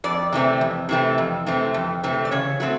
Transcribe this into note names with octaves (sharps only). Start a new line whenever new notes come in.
F2 D5
C3 E3 A3 C4
F2
C3 E3 A3 C4
F2
C3 E3 A3 C4
F2
C3 E3 A3 C4
D5
C#3 C#5
F#3 A3 C4